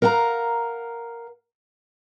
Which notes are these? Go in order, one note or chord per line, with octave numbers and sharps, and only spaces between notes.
A#4 F5 F#5 A5 A#5